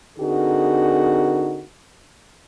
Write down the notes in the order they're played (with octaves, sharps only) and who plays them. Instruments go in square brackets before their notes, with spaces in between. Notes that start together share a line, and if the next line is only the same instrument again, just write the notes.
[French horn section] D3 C4 D#4 F#4 G#4 A#4